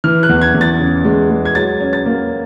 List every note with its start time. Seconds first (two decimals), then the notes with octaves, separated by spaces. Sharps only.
0.04 E3 F6
0.23 F#6
0.29 E2
0.41 G#6
0.54 E2
0.61 A6
0.80 C#3
1.05 G#3
1.30 G#3
1.45 G#6
1.55 F#3 A6
1.80 C#4
1.93 A6
2.06 A#3